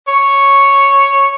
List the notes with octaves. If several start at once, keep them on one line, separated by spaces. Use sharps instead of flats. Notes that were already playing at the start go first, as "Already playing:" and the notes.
C#5